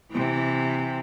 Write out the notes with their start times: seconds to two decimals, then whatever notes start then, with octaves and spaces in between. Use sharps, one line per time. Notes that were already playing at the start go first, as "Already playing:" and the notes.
0.11 C3 E3